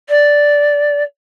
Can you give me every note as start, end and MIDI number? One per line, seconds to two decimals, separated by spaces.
0.09 1.03 74